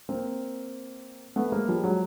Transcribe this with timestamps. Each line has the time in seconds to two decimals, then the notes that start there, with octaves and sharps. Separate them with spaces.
0.09 A#3 C4
1.36 A3 B3
1.52 G#3 A#3
1.68 F3 G3
1.84 F#3 G#3